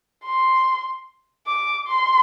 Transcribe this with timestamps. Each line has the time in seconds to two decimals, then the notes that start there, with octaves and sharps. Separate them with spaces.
0.24 C6
1.47 D6
1.88 C6